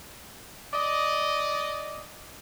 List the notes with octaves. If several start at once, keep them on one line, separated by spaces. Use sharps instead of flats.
D5 D#5